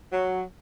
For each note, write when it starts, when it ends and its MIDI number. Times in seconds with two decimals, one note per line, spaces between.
0.12 0.42 54